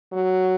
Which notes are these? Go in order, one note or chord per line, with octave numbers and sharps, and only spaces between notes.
F#3